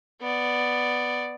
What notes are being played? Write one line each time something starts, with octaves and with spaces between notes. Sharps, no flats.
B3 D5